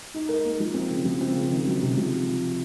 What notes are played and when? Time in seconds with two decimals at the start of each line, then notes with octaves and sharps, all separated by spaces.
0.14 D#4
0.29 A#4
0.45 A#3
0.60 F3
0.74 C4
0.91 C#3
1.05 F3
1.21 C4
1.36 C#3
1.51 D#3
1.67 F#3
1.82 C3
1.97 F3